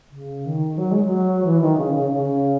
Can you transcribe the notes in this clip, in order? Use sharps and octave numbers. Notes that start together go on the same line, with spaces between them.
C#3
D#3
F#3
G#3
F#3
E3
D#3
C#3
C#3
C#3